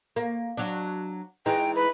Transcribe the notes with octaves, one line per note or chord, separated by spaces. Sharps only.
A#3
F#3 D4
E3 G#3 D#4 G5
B4